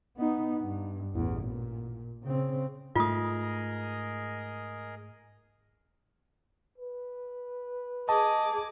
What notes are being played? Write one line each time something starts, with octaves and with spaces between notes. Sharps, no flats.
B3 D#4
G2
A1 E2
A#2
C#3 C4
G#2 A3 F4 G#4 A#4 D#5 D#6
B4
G#4 D#5 A5 D6